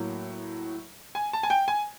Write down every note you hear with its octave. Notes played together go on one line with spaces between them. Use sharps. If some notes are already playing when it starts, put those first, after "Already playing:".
Already playing: A2 F#3 A#3
G#5
A5
G#5
G5
G#5